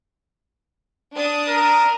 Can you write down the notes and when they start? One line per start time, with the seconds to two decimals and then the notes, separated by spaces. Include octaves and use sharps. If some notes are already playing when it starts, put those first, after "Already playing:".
1.15 D4 D#6
1.48 A#4